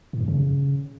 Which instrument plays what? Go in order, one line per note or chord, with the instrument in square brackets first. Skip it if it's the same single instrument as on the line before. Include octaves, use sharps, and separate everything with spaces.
[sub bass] A2
F#2
C#3